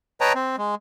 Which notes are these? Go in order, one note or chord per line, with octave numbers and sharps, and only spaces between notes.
B4 C#5 D#5 G5 A5 A#5
C4
G#3